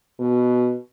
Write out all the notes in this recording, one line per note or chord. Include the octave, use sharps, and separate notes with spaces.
B2